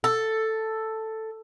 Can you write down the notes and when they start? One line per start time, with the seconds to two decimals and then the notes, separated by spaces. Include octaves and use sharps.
0.04 A4